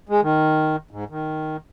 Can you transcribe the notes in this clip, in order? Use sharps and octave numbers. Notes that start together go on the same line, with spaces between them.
G#3
D#3
G#2
D#3